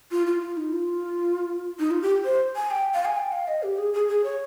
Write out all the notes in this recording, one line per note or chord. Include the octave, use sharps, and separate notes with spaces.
F4
F4
F4
D#4
F4
D#4
F4
G4
C5
G#5
G5
F5
G#5
G5
F5
D#5
G4
G#4
G#4
G#4
C#5